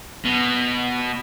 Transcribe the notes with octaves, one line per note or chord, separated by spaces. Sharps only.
B2